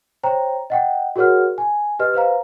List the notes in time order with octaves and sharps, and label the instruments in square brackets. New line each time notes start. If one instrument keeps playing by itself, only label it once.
[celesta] C5 C#5 G5 A#5
D#5 F#5 G5
F#4 G#4 A#4 C#5 F#5 F6
G#5
G4 B4 D#5 F6
B4 C5 F5 A#5